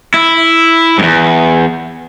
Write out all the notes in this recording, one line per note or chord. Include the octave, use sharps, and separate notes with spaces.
E4
E2 G2